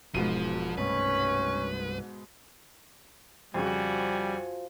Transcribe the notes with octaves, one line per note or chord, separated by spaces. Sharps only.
E1 G#2 B2 F3 D#7
C2 G2 A3 C#4 B4
F2 C#3 F3 G3 F#4 G#5